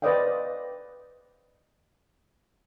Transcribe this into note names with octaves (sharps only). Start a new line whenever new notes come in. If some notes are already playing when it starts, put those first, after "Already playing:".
B4 C5 D5 D#5 F5 G5